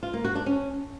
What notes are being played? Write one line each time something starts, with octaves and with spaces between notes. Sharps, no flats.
F4
A#3
F#4
D4
C#4